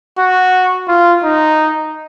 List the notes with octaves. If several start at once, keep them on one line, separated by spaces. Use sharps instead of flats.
F#4
F4
D#4